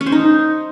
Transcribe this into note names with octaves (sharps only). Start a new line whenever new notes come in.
C#4
C5
D#4